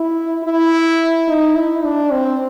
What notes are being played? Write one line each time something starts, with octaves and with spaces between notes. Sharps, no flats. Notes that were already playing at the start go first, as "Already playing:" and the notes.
Already playing: E4
E4
D#4
E4
D4
C4